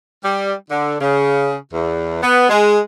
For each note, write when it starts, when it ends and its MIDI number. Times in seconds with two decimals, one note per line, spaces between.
0.23 0.52 55
0.70 0.96 50
1.00 1.54 49
1.72 2.20 40
2.22 2.47 59
2.49 2.79 56